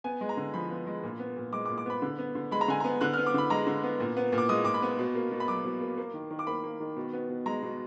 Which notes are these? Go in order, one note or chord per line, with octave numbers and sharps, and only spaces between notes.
B3 G#5
G#3
A#5
D3
F3 B5
B3
G#3
A#2
B3
A#2
G#3 D6
D6
A#2
D6
B3 B5
D3
B3
D3
G#3 B5
A#5
D3 G#5
B3 A#5
D3 F#6
B3 F6
D6
D3 B5
G#3 A#5
D3
B3
A#2
B3
A#2
D6
G#3 D#6
A#2 D6
B5
B3
B2
A#3
B2
B5
F#3 D6
B2
A#3
A#3
D#3
D#3
D6
A#3 B5
A#3
D#3
B2
B3
B2
G#3 A#5
B2